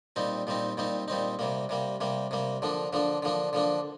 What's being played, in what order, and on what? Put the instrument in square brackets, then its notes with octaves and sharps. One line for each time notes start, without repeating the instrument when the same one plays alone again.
[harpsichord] A#2 G3 C4 D#4
A#2 G3 C4 D#4
A#2 G3 C4 D#4
A#2 G3 C4 D#4
C3 G3 A#3
C3 G3 A#3
C3 G3 A#3
C3 G3 A#3
D3 F3 A#3 D4
D3 F3 A#3 D4
D3 F3 A#3 D4
D3 F3 A#3 D4